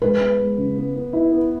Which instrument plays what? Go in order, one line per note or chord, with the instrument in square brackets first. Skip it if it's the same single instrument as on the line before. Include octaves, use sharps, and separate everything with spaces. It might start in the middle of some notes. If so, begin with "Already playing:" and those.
[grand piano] G#3 [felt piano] B4
[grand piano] B3
G#3
C#3
B3
B3
E4
B3